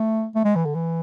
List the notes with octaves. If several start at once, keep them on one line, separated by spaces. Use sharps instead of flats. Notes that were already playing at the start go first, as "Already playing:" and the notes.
Already playing: A3
A3
G#3
E3
D3
E3